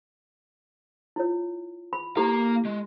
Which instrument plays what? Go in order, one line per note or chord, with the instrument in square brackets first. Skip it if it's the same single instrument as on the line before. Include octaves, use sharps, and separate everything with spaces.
[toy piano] E4 F4 C#5
B5
[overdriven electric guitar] A#3 A#5 [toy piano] E4 G4 A4
[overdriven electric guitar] G#3